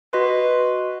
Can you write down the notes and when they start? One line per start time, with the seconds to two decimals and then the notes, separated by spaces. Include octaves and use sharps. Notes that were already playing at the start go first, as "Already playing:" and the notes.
0.13 F#4 B4 D#5 C6